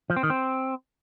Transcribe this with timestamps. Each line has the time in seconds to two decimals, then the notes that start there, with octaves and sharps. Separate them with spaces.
0.10 F3
0.16 C4
0.23 D#3
0.30 C4